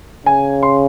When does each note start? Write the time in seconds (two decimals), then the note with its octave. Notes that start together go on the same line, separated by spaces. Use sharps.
0.26 C#3 G#5
0.63 C6